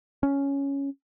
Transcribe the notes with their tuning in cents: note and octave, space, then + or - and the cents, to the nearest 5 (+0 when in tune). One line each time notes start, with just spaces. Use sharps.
C#4 +5